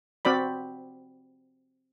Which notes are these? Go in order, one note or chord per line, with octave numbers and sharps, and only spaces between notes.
C4 F#4 D5 B5